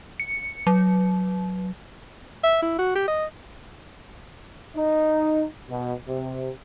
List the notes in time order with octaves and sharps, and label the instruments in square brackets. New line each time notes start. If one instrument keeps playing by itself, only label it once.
[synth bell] C#7
F#3
[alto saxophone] E5
E4
F#4
G4
D#5
[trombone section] D#4
B2
C3